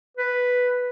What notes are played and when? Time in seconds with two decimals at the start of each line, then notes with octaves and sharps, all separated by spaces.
0.17 B4